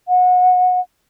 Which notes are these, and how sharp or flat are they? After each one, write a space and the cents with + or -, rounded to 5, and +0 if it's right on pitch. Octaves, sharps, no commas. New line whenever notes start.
F#5 -25